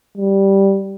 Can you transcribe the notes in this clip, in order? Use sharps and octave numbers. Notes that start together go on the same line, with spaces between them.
G3